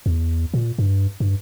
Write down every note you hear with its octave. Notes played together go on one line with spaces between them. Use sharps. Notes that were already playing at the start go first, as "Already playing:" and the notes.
E2
A#2
G2
G2